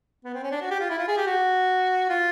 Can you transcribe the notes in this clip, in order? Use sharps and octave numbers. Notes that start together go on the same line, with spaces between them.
B3
C4
C#4
D4
F#4
G4
F4
E4
F4
G#4
G4
F#4
F4